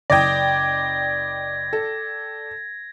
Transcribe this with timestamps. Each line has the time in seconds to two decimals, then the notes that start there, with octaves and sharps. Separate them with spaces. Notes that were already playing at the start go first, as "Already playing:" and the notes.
0.10 F#1 D5 G5 D#6 G#6 A#6
1.73 A4